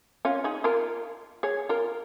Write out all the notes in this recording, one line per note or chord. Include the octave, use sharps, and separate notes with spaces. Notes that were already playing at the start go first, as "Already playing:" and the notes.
C#4 F4
D#4 G#4
F4 A#4
G#4 C#5
F4 A#4